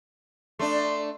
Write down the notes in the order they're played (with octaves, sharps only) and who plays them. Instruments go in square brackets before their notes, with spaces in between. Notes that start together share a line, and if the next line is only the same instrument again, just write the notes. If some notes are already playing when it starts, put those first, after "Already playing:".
[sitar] A3 D4 [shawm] C6